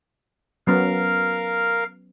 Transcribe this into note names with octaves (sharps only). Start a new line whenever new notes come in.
F#3 B3 C#4 A#4 F5